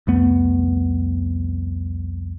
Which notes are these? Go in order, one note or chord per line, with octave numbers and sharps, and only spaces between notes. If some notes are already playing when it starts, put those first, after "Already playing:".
C2 F2 A3 B3